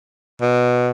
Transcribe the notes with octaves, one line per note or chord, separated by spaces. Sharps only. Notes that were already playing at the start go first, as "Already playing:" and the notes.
B2